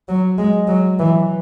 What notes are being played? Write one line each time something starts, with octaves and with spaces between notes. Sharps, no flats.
F#3
G#3
F#3
E3